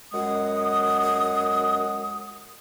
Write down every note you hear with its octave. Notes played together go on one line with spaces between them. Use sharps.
F#2 G#3 F#5 D#6